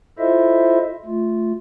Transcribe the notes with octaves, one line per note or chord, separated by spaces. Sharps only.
E4 F4 A4 C5 D#5 E5
A3 F4